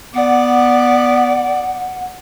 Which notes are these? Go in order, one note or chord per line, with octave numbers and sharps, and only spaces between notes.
B3 D5 F#5